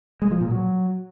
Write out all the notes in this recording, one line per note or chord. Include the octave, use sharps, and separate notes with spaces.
G#3
F3
A#2
F#3